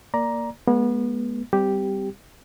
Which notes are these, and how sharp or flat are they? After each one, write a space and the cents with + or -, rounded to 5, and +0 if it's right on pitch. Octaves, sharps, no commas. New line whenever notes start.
A#3 +0 D5 +0 A#5 +10
G#3 +25 B3 -30
G3 +0 C4 -25 G4 +0